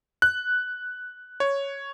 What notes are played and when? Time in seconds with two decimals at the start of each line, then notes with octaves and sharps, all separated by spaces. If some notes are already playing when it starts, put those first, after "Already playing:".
0.22 F#6
1.40 C#5